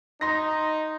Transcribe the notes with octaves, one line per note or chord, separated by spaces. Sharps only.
D#4 C6 A#6